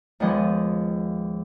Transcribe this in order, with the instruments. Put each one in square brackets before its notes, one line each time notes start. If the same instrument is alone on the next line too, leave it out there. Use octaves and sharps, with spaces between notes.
[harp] D#2 F3 G#3 B3 D#5 G#5